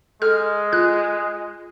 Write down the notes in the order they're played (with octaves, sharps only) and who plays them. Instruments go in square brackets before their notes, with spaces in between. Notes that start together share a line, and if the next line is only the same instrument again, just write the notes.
[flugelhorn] G#3 [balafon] A4 [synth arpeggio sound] F6
[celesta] F4 [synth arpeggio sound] F#6